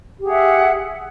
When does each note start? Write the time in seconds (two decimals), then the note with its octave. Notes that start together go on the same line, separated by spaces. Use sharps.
0.19 G4
0.23 G#4
0.26 F#5
0.30 E5